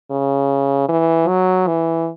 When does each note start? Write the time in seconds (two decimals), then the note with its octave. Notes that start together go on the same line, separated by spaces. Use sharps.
0.11 C#3
0.89 E3
1.28 F#3
1.67 E3